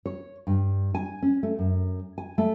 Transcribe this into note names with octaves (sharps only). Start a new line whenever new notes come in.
C#5
G2
G#5
C#4
A3
F#2
G#5
A3